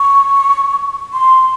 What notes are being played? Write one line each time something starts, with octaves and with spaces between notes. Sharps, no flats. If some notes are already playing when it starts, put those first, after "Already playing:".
Already playing: C#6
C6